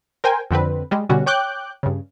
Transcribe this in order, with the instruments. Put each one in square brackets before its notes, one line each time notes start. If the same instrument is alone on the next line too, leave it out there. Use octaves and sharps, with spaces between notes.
[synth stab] A#4 C5 G5 G#5
F2 D3 C4 B4
G3 G#3
B2 D3 G3 C#4 F#4
C#5 G5 D6 F#6 G6
G2 C#3